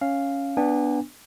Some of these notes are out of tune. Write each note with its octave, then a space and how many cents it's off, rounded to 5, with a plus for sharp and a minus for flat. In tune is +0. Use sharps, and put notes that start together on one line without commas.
C#4 +0 F5 +0
B3 +0 D4 +0 G#5 -35